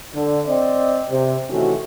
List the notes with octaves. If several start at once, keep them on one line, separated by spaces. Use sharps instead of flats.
D3
C4 D5 D#5
C3
C3 D#3 E3 A3 C#4 F#4